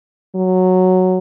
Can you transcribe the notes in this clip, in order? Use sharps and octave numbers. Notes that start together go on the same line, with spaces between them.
F#3